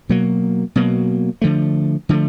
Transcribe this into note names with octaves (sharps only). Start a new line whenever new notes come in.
B2 F#3 A#3
B2 F#3 A#3
D3 F3 A3
D3 F3 A3